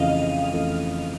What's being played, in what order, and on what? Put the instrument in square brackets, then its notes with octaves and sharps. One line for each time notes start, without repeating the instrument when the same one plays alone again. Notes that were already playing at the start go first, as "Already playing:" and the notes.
Already playing: [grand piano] F2 C#3 E3 A3 [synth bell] D#5 F5
[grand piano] F2 C#3 E3 A3